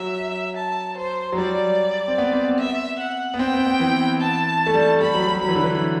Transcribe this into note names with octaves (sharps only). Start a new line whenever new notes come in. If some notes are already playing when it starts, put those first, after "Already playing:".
Already playing: F#3 E5
A5
C5
F#3
G3 D5
C4
B3
C4
B3
E5
F#5
B3
C4 G5
B3
B3
E3
A5
A3
G3
G3 B5
F#3
F#3
F#3 B5
E3
D3
E3